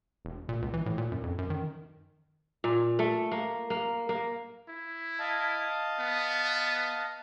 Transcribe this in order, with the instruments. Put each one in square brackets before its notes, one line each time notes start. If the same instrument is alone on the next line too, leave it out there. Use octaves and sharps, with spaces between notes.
[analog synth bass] E1
A#2
C#2
E3
A2
A#2
F#2
F2
F#2
D#3
[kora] A#2
A3
A#3
A#3
A#3
[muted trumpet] E4
[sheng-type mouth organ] D#5 F5 A5
[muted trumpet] B3